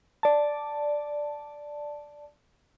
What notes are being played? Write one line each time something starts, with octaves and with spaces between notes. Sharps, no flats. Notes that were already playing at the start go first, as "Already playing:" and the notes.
D5 A5